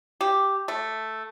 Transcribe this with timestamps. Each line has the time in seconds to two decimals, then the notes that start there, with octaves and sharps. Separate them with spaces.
0.21 G4
0.68 A3